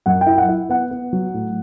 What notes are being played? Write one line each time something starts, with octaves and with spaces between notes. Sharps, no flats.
F#2 F#5
G5
E4
F#5
E4
B3 F#5
B3
F#3
A2